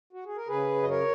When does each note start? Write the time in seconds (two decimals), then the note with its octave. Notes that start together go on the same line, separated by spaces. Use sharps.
0.13 F#4
0.25 G#4
0.37 A#4
0.47 C#3 G#4 B4
0.75 F#2
0.83 D#5
0.89 A#4 C#5